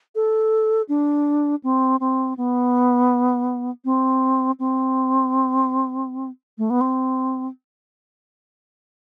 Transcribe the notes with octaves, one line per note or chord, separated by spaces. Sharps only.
A4
D4
C4
C4
B3
C4
C4
A3
B3
C4